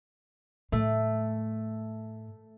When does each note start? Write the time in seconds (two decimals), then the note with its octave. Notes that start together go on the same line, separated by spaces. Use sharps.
0.72 A2 A3